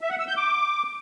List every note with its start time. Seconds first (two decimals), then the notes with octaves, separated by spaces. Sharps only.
0.01 E5
0.10 F#5
0.19 E6
0.28 G6
0.37 D6